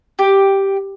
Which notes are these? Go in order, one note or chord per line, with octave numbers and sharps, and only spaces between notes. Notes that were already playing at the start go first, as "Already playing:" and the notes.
G4